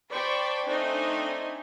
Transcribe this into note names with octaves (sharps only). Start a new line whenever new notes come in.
C5 D5 G5 A5 B5 C#6
A3 C4 D4 D#4 D#5 G#5